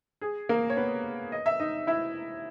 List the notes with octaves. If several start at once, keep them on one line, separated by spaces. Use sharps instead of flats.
G#4
A#3 A#4
C#5
B3 B4
D#5
E5
D#4 D#5
E4 E5